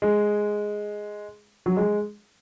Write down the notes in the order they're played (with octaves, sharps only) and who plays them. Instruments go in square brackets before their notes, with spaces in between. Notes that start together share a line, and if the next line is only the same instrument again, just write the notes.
[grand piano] G#3
F#3
G#3